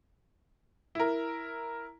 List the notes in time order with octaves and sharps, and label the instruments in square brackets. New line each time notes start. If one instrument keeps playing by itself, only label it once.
[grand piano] E4 A#4